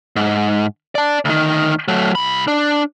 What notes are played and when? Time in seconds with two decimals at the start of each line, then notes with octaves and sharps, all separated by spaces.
0.16 G#2
0.95 D5 A5
1.25 D2 D#3
1.88 F#3 A3
2.15 C2 B5
2.48 D4